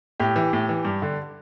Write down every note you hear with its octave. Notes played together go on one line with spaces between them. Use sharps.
A2 G4
E3
A2
E3
G2
D3